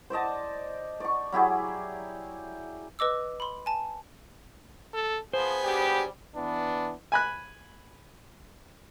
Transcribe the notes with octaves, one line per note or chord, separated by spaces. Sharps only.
C5 D5 D#5 A5
D5 C#6
F#3 E4 G4 G#4
B4 D#5 D6 E6
B5 C6
G#5 A5
A4
F3 B3 G#4 C5
F#3 G3 D4 G4
E3 B3 D4
G#5 B5 F#6